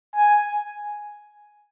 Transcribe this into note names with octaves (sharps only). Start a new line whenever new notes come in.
G#5